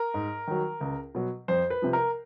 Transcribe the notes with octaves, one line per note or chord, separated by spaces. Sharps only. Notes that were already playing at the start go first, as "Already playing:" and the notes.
Already playing: A#4
G#2
D#3 F#3
C#2
B2 F#3
F2 C5
B4
C3 F3
A#4